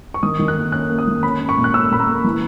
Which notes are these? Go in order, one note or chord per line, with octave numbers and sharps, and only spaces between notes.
C#6
D#3 D#6
D#3
F#6
A#3
C#4 F#6
A#3
D#6
D#3
C#4 B5
C#4
C#6
A#2
F#6
C#4 E6
A#2 B5
A#5
A#3
E3